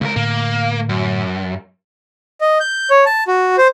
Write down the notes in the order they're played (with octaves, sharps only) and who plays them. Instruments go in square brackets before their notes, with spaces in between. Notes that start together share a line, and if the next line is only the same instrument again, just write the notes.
[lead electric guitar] C#2 A#4 [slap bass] G#3
[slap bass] A2 D3 [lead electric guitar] A#3
[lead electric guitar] F#2
[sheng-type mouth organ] D#5
G6
C#5
A5
F#4
C5